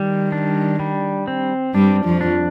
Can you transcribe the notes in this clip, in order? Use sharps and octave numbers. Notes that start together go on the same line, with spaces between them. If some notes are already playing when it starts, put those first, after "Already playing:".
Already playing: D#3 G3
D4
G3
C4
G2 G3 D4
F2 F3
D4